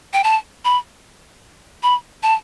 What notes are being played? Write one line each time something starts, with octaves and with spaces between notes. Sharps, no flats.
G5
A5
B5
B5
A5